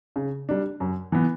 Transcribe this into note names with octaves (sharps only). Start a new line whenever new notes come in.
C#3
G3 D4
F#2
E3 B3